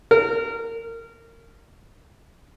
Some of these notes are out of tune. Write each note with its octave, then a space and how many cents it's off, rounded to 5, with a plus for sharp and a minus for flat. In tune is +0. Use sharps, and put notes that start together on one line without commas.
A#4 -25